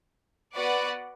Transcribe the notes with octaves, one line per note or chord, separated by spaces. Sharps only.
B3 F#4 B4 D5 F#5